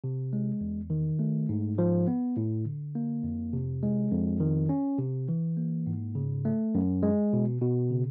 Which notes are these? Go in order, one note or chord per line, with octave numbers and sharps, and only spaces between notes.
C3
G#3
E2
D#3
A3
G#2
F3
B3
A2
D3
A#3
F2
C3
G#3
F2
D#3
C#4
C3
E3
A#3
G#2
C#3
A3
F#2
G#3
B2
B2
C#3